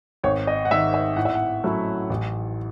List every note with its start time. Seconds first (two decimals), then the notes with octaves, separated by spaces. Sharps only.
0.23 G#1 C#5
0.47 D#5
0.65 F#5
0.71 G#2 D#3 E5
0.94 E5
1.16 A2 F#5
1.25 E5
1.35 F#5
1.63 F#3 A3 C#4 E4
2.10 A1